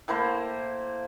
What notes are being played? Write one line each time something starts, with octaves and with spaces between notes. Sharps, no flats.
A2 A#3 E4 C5